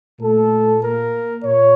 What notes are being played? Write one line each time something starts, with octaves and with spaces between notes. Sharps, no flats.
A#2 A3 A4
A#3 A#4
A#2 C#5